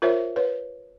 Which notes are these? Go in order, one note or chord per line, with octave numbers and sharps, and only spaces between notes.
F4 A#4 C5 C#5 E5
B4 C#5